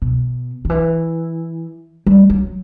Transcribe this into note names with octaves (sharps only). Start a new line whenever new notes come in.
B2
D#3
E3
G3
F#3